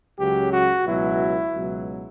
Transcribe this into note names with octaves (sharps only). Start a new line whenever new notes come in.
C#2 C#3 F#3 G4
F#4
C#2 B2 F#3 E4
C#2 B2 F#3